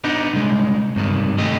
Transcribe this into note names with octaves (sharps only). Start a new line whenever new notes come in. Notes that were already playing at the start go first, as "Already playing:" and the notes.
B3 D4 D#4
C2 G#3
G2 C3 D#3
A3 G4 D#5